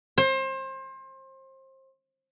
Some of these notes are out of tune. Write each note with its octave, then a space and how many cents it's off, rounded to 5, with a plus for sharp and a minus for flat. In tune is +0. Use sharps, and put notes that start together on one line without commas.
C5 +30